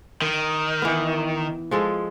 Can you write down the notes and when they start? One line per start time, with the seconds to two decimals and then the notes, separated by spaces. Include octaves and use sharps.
0.22 D#3
0.82 E3 B3
1.71 F3 G#3 A4